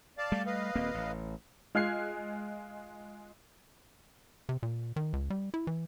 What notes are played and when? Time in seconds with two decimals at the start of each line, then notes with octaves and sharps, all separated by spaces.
0.18 D5 F5 A5
0.32 G3 A3
0.46 B4 D#5 F5
0.75 D#1 A#3 C4
0.94 A1
1.75 G#3 F4 F6 F#6 G#6 C7
4.49 C3
4.63 A#2
4.96 D#3
5.13 C#2
5.30 G3
5.54 E4
5.67 E3